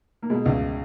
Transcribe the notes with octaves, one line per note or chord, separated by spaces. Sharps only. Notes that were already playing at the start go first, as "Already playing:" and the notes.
A#3
B2 G#3
C#2